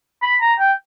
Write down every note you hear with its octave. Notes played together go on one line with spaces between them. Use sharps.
B5
A#5
G5